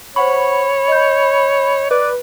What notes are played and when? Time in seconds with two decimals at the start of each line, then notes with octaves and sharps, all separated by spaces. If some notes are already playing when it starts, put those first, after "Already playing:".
0.16 C5 C#5 F#5 B5 C#6
0.88 D#5 G6
1.91 B4 D5